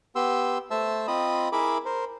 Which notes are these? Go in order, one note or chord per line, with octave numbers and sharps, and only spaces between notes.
B3 G4 C6 E6
A3 C5 E5 A5 E6
C4 F4 D#5 B5 D#6
E4 G#4 A#4 E5 B5 D6
A#4 C5